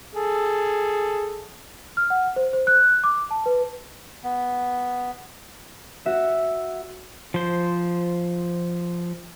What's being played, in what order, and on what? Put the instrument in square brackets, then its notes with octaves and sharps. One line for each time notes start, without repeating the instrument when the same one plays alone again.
[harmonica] G#4 A4
[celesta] F6
F#5
C5
C5
F#6
D6
A5
B4
[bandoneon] B3
[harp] F#4 E5
[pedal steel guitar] F3 C5